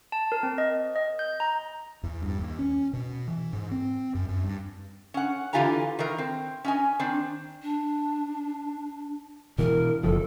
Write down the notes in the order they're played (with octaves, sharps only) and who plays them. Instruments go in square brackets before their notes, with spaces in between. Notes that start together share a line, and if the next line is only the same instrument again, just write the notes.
[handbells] A5
A#4
C4
D#5
D#5
G6
A#5
[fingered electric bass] E2
G2
D#2
C#4
B2
E3
G#2
C4
F#2
F#2
G2
[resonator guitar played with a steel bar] C#4 F#5
D3 E3 F4 G4 G#5 A#5
D#3 E3 A#4
C4
C#4 D#5 G#5
D#3 C4 D4
[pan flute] D4
[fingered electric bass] B2 E3 [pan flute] A#4
[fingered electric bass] F#1 F3 [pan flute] A4